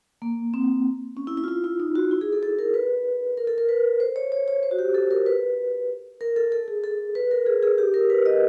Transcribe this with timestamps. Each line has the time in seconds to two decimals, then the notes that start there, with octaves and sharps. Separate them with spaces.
0.22 A#3
0.54 C4
1.17 C#4
1.27 E4
1.37 E4
1.44 F4
1.48 E4
1.64 E4
1.80 D#4
1.95 F#4
2.11 E4
2.21 G#4
2.32 A4
2.43 A4
2.59 A#4
2.74 B4
3.37 A#4
3.47 A4
3.58 A#4
3.69 B4
4.00 C5
4.16 C#5
4.32 C#5
4.48 C#5
4.63 C5
4.71 F#4
4.79 G4
4.94 A4
5.11 A#4
5.26 B4
6.21 A#4
6.36 A4
6.52 A4
6.68 G#4
6.84 A4
7.15 B4
7.31 A#4
7.47 G#4
7.63 G#4
7.78 G4
7.94 A#4
8.10 B4
8.26 D#5